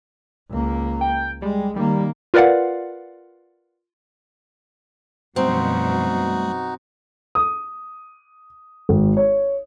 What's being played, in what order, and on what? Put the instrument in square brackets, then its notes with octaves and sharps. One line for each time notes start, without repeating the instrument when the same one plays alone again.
[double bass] C#2 A#3
[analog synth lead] G5
[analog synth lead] G3 [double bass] G#3
[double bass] D#3 A#3 [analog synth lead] G3
[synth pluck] F4 A#4 B4 D5 F5 F#5
[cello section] F#2 B2 F3 [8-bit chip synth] G3 A3 [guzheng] C4 [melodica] D#4 F#4
[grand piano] D#6
G#1
C#5